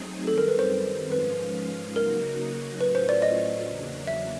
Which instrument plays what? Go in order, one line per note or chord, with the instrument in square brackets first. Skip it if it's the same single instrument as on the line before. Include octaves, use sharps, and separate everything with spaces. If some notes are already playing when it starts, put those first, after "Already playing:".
Already playing: [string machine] F#3 A3 C4 D#4 G#4
[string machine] F#2 D#3 G3 C4 [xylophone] A4
[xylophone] A#4
B4
C5
[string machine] G#2 F3 G#3 C#4 F4 [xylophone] B4
[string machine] C#3 F#3 A#3 D#4 F#4 [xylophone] A#4
[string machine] A2 F#3 A3 C#4 F4 [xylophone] B4
[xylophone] C5
D5
D#5
[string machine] E2 C#3 F#3 A#3 D4
[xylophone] E5